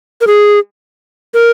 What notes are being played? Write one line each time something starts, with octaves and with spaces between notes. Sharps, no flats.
A#4
G#4
A#4